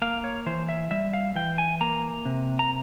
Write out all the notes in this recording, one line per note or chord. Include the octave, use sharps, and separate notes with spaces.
A#3 F5
C#5
E3 C5
E5
G3 E5
F5
E3 G5
G#5
A#3 A#5
C3
A#5